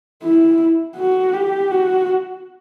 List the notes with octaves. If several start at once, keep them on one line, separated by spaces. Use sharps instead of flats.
E4
F#4
G4
F#4